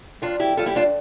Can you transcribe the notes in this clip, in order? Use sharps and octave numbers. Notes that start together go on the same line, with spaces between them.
F2 D4 F4
F2 E4 G4
G3 F4 A4
E4 G4
F2 D4 F4